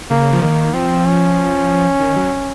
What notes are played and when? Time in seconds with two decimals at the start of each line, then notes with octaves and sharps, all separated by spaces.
0.10 C#3 A#3
0.33 F3
0.42 D#3 A#3
0.73 F3 C4
1.05 C#4
2.00 D#3
2.16 F#3